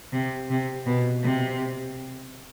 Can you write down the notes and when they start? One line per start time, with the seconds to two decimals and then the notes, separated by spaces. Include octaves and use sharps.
0.13 C3
0.50 C3
0.86 B2
1.23 C3